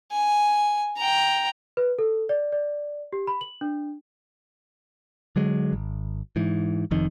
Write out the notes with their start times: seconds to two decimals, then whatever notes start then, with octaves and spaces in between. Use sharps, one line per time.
0.12 G#5
0.97 G5 A#5
1.77 B4
1.99 A4
2.29 D5
2.52 D5
3.13 G4
3.27 B5
3.41 F#7
3.61 D4
5.36 D3 F#3 G#3
5.72 G#1
6.36 G#2 E3
6.91 F1 F2 D#3